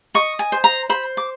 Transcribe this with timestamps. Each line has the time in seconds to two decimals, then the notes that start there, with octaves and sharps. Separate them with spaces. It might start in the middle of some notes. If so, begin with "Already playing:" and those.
0.15 D#5 C#6
0.39 G#5
0.52 C5
0.64 A#5
0.89 C5 B5
1.17 D6